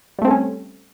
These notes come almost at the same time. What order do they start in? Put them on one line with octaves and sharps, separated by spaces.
G3 A3 C4 A4 C#4